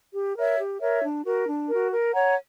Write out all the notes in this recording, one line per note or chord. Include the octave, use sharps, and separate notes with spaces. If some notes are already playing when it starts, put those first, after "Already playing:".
G4
A#4 C#5 E5
G4
A#4 C#5 E5
D4
F#4 A#4
D4
F#4 A#4
A#4
C#5 F#5 A#5